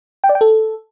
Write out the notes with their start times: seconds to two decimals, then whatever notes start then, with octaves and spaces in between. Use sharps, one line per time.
0.24 G5
0.29 D5
0.35 G5
0.41 A4